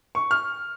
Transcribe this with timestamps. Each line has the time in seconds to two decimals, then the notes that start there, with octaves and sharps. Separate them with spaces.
0.15 C#6
0.31 F6